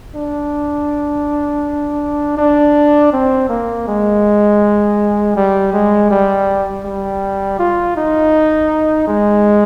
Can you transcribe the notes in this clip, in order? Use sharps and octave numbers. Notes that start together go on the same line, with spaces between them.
D4
D4
C4
A#3
G#3
G3
G#3
G3
G3
F4
D#4
G#3